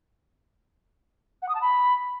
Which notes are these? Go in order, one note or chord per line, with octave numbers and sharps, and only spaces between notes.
F#5
D#6
A5
B5